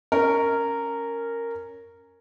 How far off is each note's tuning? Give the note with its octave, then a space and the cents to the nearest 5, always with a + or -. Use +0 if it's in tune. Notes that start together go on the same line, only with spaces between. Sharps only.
C#4 +0 A#4 -10